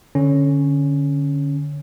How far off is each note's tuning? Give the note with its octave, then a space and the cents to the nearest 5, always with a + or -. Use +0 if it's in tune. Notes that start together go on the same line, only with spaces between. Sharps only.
D3 -5 C#4 +0